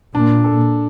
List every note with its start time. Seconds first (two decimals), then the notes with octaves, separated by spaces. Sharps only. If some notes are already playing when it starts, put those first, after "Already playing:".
0.14 A#2 D4
0.44 A4